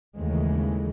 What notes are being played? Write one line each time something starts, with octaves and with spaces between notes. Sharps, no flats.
D#2 C#3 E3 G#3 A3